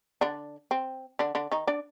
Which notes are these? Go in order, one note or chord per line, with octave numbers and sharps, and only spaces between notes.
D3 D4
C4
D3 D4
D3 D4
D#3 D#4
D4 D5